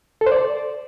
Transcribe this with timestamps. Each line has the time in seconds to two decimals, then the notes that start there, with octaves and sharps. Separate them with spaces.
0.21 A4
0.26 C5
0.32 D5